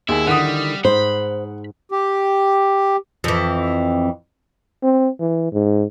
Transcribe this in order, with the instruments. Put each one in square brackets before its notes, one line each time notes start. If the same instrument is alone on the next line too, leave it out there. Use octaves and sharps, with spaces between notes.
[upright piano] D#2 G#4 [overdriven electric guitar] E4
[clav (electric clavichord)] D3 D#3 E4 [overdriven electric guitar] G3 [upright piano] F#5 D#6
[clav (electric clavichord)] G#2 [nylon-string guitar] C5 [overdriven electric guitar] B5
[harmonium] G4
[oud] F2 E3
[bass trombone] C4
E3
G#2